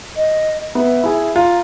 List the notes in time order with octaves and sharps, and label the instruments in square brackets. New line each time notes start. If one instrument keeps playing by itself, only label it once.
[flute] D#5
[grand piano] B3 [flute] E5
[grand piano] E4 G#4
[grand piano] F4 [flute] A#5